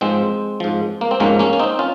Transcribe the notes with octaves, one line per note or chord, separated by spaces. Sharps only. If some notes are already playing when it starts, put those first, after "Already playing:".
G#2 F3 G#3 C4
G#2 F3
A#3
C4
G#2 F3 A#3 C#4
A#3 C#4
C#4
C4 D#4
C#4 F4